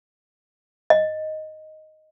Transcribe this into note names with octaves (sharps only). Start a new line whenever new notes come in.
D#5